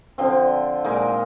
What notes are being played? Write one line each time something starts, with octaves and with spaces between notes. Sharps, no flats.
D3 F3 C4
A#2 G#3 D#4 A#4